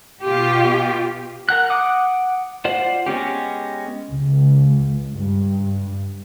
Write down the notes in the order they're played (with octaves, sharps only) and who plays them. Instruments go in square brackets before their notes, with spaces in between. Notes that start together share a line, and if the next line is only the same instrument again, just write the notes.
[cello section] B2 F4 G4
[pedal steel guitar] A#4 F#5 F#6
F#5 D6 D#6
F4 C5 D5 F#5
G#3 B3 C#4 G4
[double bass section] C#2
G2